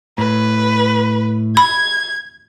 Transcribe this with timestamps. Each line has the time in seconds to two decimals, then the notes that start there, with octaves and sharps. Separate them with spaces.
0.18 A2 B4
1.57 B5 G#6